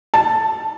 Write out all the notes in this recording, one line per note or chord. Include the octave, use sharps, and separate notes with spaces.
A5